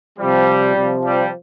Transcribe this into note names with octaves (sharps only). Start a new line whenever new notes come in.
C3 F3 G3
C3 F3
G3